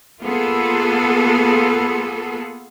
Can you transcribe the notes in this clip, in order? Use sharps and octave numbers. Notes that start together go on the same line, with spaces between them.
A#3 B3 F4 G#4 A4